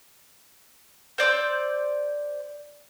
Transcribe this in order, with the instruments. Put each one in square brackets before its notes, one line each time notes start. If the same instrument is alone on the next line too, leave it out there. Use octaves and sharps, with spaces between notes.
[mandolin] C5 D5 E6 G6